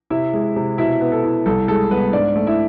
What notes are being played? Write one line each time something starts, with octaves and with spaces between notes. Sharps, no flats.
C3 E4 E5
G#3
C3
B2 E4 E5
B3
A4
E4
C2 A4
G#3 A4
C2 B3 B4
G#2 D4 D5
A3
E4 E5